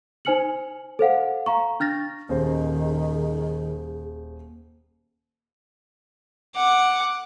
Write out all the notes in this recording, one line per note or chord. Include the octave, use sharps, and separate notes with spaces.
D#4 C5 G#5 F6 C#7 F#7
A4 C5 F5 F#5
F5 A#5 C#6
D4 F6 A6 A#6
D#1 D#3 G#4 C5
F#5 D6